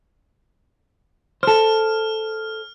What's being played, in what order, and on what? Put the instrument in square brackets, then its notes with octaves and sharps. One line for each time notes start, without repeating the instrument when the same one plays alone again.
[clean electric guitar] A4 C5 [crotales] F6